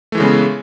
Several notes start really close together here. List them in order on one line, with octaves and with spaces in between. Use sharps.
A3 E3 G#3 C#3 B3